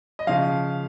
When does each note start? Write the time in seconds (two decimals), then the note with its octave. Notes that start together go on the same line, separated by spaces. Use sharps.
0.19 D#5
0.27 C#3 F3 F5